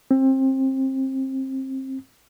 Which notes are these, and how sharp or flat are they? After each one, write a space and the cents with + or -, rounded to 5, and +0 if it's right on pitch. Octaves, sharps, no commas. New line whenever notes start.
C4 +25